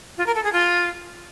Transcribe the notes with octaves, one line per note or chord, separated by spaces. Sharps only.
F4
A#4
A4
G#4
F4